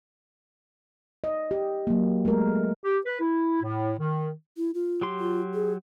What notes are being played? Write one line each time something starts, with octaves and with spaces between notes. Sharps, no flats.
D#5
G4
F#3 A#3
G#3 A3 A#4
G4
B4
E4
A2
D#3
E4
F4
F#3 G4 C6
F4
G#4